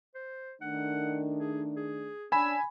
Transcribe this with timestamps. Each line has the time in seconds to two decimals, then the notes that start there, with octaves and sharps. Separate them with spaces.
0.15 C5
0.61 D#3 A3 D4 F#5
1.39 G#4
1.76 G#4
2.32 C#4 D4 G#5 B5 E6